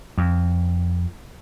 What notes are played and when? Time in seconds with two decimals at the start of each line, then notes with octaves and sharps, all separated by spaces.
0.18 F2